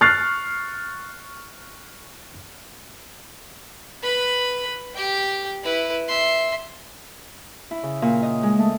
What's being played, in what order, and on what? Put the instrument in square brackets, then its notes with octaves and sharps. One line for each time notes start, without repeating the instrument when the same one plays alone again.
[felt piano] C#6 F6 F#6 A6 C7
[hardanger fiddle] B4 B5
G4 G5
E4 B4
E5 C6
[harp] E4
C#3
A#2
D#5
G#3
A3